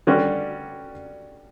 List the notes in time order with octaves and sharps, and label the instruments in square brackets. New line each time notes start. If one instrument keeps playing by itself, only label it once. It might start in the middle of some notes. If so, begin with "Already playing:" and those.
[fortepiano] D3 G3 C#4 F#4